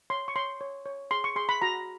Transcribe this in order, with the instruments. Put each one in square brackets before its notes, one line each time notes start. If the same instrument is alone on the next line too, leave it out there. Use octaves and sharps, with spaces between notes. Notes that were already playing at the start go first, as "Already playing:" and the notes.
[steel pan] C#5 C6
C#6
C#5 C6
C#5
C#5
G#4 C6
C#6
G#4 C6
B5
F#4 A#5